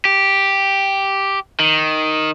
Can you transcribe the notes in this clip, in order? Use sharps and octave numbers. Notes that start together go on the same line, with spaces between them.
G4
D#3